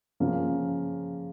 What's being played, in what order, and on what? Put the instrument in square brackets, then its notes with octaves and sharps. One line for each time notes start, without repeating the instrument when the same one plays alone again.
[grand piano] C#3 F3 A#3 C#4